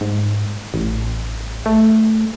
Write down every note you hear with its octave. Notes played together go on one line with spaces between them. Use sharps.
G#2
A1
A3